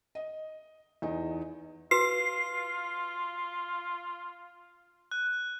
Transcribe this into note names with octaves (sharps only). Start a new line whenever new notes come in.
D#5
E2 D#4
F4 F#4 B4 C7
F#6